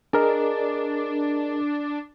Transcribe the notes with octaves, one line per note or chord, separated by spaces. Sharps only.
D4 G#4 A#4 D#5